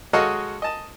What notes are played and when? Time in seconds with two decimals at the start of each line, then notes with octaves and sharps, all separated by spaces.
0.13 G#3 F#4 A4 C#5 D#5 F5
0.62 D#5 A5